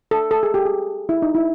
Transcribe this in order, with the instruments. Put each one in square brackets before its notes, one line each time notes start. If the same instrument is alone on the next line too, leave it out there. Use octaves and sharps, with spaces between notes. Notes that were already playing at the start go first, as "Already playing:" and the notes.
[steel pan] A4
A4
G#4
G4
G#4
E4
D#4
E4